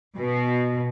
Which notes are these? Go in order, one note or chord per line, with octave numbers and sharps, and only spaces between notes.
B2